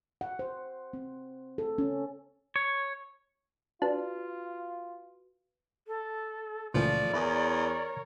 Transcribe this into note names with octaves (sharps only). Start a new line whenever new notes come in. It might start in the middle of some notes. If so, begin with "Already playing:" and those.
F#5
C5
C4
A4
C#4
C#5
D4 F4 F#4 B4
A4
C#2 A#2 E3 F3 A3 D5
E2 E4 G#4 A#4 C#5